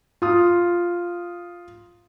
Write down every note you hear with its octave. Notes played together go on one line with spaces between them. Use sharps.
F4 D#6